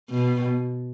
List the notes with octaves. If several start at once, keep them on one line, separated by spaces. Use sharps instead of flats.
B2